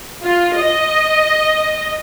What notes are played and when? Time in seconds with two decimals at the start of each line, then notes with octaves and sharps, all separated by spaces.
0.23 F4
0.56 D#5